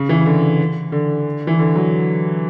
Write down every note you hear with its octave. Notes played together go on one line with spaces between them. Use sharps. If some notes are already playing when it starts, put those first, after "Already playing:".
Already playing: C#3
E3
D3
D3
E3
D3
F#3